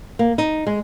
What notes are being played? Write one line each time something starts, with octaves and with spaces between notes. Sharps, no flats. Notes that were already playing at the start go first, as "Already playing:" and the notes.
A#3
D#4
G#3